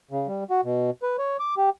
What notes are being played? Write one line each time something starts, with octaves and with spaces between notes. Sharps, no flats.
C#3
G3
F#4
B2
B4
C#5
D6
G4